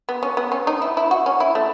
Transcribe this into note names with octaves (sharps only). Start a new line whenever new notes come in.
B3
C#4
B3
C#4
D#4
E4
E4
F#4
C#4
E4
A3